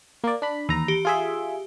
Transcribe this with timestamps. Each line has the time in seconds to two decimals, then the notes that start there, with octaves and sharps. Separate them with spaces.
0.24 A#3 D5
0.42 D4 B5
0.69 D#2 E3 A#5
0.88 G4
1.05 F4 G#4 E5